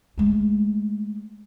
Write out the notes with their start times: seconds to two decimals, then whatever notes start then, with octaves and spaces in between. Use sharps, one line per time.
0.18 G#3 A3